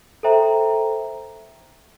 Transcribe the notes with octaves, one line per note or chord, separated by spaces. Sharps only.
A4 C5 E5 G5 A#5